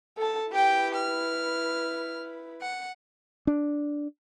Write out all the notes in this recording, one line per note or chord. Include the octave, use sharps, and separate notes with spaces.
A4 A5
E4 G4 B4 G5
F6
F#5
D4